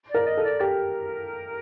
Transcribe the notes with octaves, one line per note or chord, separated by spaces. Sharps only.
D5
A#4
D#5
A4
D5
G4 A#4